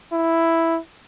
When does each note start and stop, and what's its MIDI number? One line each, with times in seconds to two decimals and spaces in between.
0.12 0.78 64